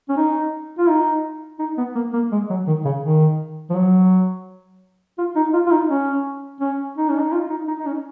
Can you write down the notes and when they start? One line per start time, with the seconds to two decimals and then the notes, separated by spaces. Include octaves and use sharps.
0.09 C#4
0.17 D#4
0.78 F4
0.89 D#4
1.59 D#4
1.78 B3
1.95 A#3
2.13 A#3
2.32 G#3
2.50 F#3
2.67 D#3
2.85 C#3
3.04 D#3
3.70 F3
3.75 F#3
5.18 F4
5.36 D#4
5.53 F4
5.66 F4
5.72 D#4
5.90 C#4
6.61 C#4
6.97 D#4
7.09 C#4
7.20 D#4
7.32 F4
7.50 D#4
7.68 D#4
7.80 D#4
7.86 C#4